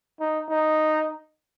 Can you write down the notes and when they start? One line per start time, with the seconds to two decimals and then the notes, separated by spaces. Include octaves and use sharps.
0.20 D#4
0.50 D#4